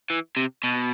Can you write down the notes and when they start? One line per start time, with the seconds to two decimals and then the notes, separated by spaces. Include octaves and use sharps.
0.10 E3
0.37 C3
0.64 B2